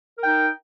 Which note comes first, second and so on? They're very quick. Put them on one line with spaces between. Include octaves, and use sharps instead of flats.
A#4 G5 D#4